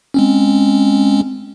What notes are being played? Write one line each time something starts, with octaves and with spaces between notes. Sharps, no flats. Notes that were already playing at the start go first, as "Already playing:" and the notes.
G#3 C4 C#4